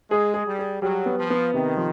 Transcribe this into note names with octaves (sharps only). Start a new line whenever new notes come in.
G#3 G#4
G#4
G3
G#4
F#3 G3
B3
F3
B3
C3 D#3
F3